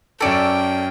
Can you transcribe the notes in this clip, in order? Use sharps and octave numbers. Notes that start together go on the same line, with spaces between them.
F#2 C#4 A4 D5 G5 C#7